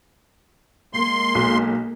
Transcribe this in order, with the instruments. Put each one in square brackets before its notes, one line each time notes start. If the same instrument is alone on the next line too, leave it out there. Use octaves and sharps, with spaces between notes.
[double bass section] G#3 A#3 [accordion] C6
[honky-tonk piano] B1